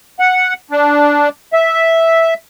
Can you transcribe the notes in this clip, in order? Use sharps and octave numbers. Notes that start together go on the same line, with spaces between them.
F#5
D4
E5